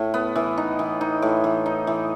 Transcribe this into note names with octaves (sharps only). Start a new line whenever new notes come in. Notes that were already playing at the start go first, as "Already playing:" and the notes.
Already playing: A2
B3
E3
D#4
E3
D#4
A2
E3
D#4
E3